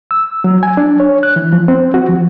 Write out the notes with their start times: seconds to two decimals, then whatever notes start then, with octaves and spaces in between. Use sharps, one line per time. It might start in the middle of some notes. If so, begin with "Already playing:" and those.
0.11 E6
0.44 F#3
0.63 G#5
0.77 D4
1.00 C#5
1.23 F#6
1.36 E3
1.53 F3
1.68 C4
1.94 F#4
2.09 F3